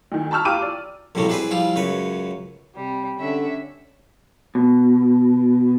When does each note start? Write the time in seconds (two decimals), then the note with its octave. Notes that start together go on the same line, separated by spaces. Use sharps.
0.12 D2 D#3
0.31 A5 B5 C#6 E6 F6
0.45 E2 F4 G4 D6 E6 D#7
0.62 D5
1.15 A#1 F#2 A2 C3 G3 A3
1.29 C4 D4 E4 G#4 B4 C5
1.51 F3 G3 E4 F4
1.76 C#2 F#2 B4 C#5
2.74 C3 G3
3.18 D3 C#4 D4 E5
4.55 B2